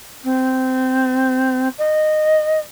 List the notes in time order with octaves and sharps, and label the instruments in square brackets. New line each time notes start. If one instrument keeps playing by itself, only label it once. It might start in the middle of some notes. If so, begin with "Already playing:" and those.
[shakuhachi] C4
D#5